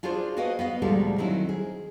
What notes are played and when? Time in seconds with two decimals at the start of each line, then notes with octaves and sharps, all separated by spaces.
0.03 D4 F4 F#4 G#4 C5 D5
0.37 F#4 G#4 B4 D#5 F5 G5
0.59 B3 D#5 F5
0.82 D2 A#2 F3 G3 G#3 A4
1.18 D#3 F#3 C4 C#4 E4
1.49 G#4